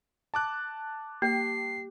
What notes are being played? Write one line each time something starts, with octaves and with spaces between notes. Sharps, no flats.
A5 D6 F#6
A#3 G4 C7